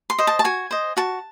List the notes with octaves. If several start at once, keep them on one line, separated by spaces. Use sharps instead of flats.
C6
C5 D#5
A5
A5
F#4 G#5
C5 D#5
F#4 A5